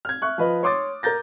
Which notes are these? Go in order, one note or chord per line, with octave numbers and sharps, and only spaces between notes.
F6 G#6
E5 C#6 F#6
F3 B4 D#5
C#5 C6 D6 D#6 A6
A#4 A#5 G6 A6 A#6